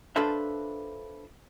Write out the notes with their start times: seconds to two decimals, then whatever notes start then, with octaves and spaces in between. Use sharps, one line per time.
0.16 D4 F4 A4 B4 C5 E5